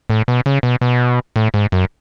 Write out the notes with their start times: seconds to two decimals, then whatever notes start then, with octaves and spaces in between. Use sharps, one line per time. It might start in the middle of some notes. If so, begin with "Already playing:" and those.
0.10 A2
0.28 B2
0.46 C#3
0.63 B2
0.81 B2
1.36 A2
1.54 G#2
1.72 F#2